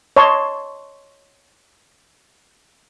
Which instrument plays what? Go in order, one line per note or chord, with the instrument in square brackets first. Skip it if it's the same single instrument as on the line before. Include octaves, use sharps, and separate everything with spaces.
[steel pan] C#5 D#5 A5 C6